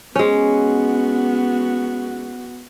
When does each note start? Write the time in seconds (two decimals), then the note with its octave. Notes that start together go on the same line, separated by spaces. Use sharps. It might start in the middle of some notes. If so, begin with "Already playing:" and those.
0.15 G#3 B3 C#4 F#4